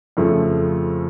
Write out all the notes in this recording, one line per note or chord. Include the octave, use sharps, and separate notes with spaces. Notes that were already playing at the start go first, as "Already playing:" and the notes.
F2 C#3 F3 A3